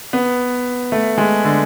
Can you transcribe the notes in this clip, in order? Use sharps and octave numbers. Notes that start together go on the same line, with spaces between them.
B3
A3
G#3
D3